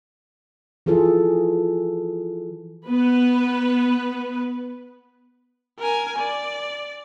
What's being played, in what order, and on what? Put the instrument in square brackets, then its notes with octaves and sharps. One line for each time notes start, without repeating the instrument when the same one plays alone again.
[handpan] E3 F3 F4 G#4 A4
[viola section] B3 B4
[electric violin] A#4 G#5
D5